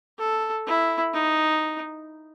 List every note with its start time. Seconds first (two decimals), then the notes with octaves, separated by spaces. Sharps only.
0.19 A4
0.67 E4
1.14 D#4